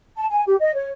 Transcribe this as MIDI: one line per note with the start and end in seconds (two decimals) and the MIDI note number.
0.16 0.26 81
0.30 0.42 80
0.46 0.55 67
0.60 0.73 75
0.74 0.91 73